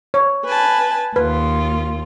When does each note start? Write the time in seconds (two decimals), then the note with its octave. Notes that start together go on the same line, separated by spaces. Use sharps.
0.14 C#5
0.44 B4 G#5 A5
1.16 D#2 F4 B4